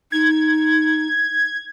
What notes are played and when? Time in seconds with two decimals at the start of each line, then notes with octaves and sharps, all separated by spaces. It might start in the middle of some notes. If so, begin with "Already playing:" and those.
0.12 D#4 G#6